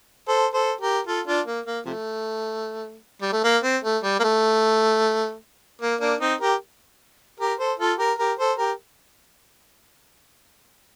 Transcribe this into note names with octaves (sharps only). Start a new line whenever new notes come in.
A4 C5
A4 C5
G4 A#4
F4 A4
D4 F4
A#3
A#3
C3 F3 A3
G3
A3
A#3
C4
A3
G3
A#3
A3
A#3
A#3 D4
C4 D#4
G4 A#4
G4 A#4
A4 C5
F4 A4
G4 A#4
G4 A#4
A4 C5
G4 A#4